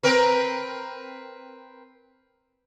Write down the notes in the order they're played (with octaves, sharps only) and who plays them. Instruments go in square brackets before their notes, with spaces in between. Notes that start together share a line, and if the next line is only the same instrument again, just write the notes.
[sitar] C4 A#4 B4